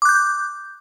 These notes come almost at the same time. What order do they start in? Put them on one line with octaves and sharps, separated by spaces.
D6 F#6 G6